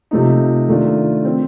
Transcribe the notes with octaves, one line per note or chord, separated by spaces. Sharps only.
C3 F3 A3 D#4
D#3 A3 D4 F4
F3 C4